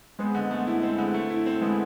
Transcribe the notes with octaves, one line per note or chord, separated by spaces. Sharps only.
G#3 B3 C4
D3
A3
E4
C4
D3
A3
E4
C4
D3 G#3 B3